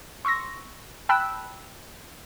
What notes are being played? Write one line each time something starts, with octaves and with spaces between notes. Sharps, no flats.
C6 C#6 E6 A#6
G5 A5 B5 E6 F#6